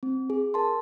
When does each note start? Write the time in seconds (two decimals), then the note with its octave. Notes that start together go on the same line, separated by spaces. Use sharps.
0.03 C4
0.30 G#4
0.54 A#4 A5 C6